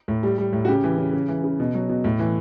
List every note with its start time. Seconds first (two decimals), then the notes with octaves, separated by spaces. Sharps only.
0.08 A2
0.23 G3
0.38 G3
0.53 A2
0.65 F#4
0.68 C#3 G4
0.84 E3
0.98 C#3
1.13 C#3
1.28 E3
1.44 C#3
1.60 B2
1.74 F#3
1.89 B2
2.04 A2
2.19 E3